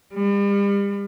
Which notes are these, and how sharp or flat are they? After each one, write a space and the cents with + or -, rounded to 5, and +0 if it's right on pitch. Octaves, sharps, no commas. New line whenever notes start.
G3 +40